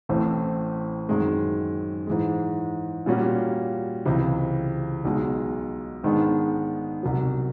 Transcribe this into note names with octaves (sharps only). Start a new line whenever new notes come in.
A1 A2 E3 A3 C4
F#2 D#3 G#3 C4
G#2 E3 G#3
A#2 G3 A#3 C#4 F#4
C#2 C3 E3
B1 B2 G#3
G#2 D#3 G#3 B3 D4
C2 B2 F#3